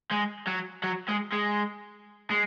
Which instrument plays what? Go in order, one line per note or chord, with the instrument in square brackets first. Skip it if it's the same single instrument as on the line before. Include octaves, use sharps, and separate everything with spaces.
[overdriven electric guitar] G#3
F#3
F#3
G#3
G#3
G#3